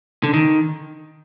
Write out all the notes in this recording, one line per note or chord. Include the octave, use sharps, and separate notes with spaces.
D3
D#3